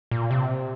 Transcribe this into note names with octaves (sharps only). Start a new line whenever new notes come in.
A#2
C3